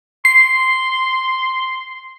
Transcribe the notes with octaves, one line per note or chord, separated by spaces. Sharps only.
C6 C7